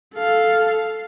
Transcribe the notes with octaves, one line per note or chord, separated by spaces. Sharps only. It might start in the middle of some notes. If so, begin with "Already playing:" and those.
A4 F5